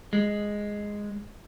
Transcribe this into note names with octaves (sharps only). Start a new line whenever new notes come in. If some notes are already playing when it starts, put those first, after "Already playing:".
G#3